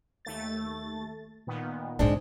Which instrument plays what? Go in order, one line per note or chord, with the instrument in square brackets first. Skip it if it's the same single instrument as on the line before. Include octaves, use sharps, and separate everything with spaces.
[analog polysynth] D#2 A3 A6
A#2 D#3 B3
[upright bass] G#2 D3 [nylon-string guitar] G#3 C4 D4